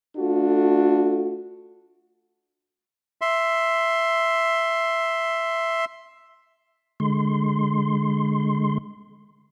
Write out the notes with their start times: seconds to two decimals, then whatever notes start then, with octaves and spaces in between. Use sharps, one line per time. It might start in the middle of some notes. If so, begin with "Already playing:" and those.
0.16 A3 D4 F4 F#4 A4
3.21 E5 C6
7.00 D3 G#3 C6